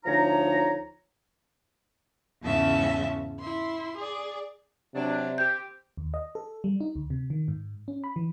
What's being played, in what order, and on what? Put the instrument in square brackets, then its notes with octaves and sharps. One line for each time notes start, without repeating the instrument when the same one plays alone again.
[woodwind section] D2 F3 D#4 C#5 A#5
[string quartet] E2 G#2 C#3 C#4 E5 A5
E4 C6
G#4 D5
[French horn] C3 [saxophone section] F#3 D4
[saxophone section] C4 G4 [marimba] G6
[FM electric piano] D#2
D#5
A4
G3
D#4
D2
C3
D#3
G#2
C#4
B5
E3